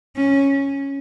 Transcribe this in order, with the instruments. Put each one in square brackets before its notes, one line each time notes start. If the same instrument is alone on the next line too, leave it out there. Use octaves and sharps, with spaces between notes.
[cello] C#4